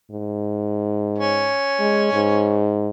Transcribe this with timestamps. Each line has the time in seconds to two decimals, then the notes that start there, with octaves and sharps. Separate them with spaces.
0.11 G#2
1.18 C#4
1.79 G#3
2.13 G#2